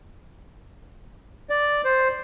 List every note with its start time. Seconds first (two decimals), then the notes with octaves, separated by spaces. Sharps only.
1.50 D5
1.85 C5